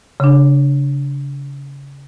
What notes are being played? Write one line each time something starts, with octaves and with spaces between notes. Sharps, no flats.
C#3 D4